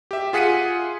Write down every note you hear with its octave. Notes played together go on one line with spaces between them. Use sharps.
G4 E5
F4 G#4 F#5 B6 C#7 D#7